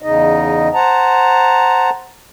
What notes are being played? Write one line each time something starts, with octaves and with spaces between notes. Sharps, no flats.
E2 C#3 D#4 D#5
C5 F#5 A5 A#5